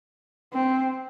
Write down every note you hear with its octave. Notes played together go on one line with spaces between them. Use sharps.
C4